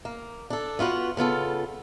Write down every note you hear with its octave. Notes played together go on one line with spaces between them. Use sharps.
A#3
D4 A4
B3 F4 F#4 B4
C#3 B3 F4 A4